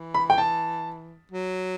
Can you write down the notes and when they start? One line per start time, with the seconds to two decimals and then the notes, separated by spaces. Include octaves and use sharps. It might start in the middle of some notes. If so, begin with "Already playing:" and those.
Already playing: E3
0.14 B5
0.30 G5
0.38 A5
1.31 F#3